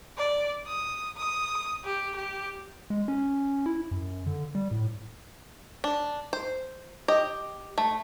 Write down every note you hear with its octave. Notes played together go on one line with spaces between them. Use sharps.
D5
D#6
D#6
G4
G4
G#3
C#4
E4
F#2
D3
G3
A2
D4
C5
G4 D#5
A3